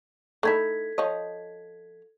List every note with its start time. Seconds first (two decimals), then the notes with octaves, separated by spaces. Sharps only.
0.43 A3 D#4 E4 A4 G#6 B6
0.98 F3 C#5 D#5